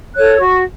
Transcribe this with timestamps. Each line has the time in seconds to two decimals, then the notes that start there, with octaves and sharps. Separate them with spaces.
0.15 A4 C#5 F#6
0.39 F#4 C#6